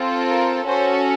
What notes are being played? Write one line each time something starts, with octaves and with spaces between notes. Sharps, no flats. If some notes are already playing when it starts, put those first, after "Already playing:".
Already playing: C4 F4 A4
A#4
C#4 F#4 A4 C5